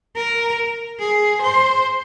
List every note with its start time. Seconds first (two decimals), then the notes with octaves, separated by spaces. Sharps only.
0.16 A#4
1.00 G#4
1.42 C5